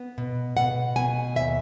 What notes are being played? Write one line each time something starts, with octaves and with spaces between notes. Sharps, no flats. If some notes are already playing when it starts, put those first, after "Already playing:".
Already playing: B3
B2
B2 F#5
B2 G#5
D#2 E5